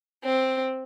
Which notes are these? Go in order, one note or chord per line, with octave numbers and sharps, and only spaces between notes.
C4